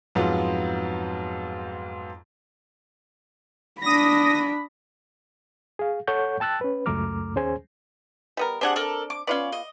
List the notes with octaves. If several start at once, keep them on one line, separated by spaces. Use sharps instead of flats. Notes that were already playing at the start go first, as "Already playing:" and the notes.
F2 G#2 F#3 B3 F4
D4 B5 D#6 A#6
G#4 F5
A4 C#5 F#5 C#6 G6
G5 A5 E6 F#6 A6
C#4 B4
C#2 F#2 A3 A#5 D6 F6
D#2 C#4 G#4 C5 G#5
G3 B3 A#4
C4 D4 G4 G#4 F#5
A4 A#4 D5
D6
B3 C#4 F4 D5 F5
D#5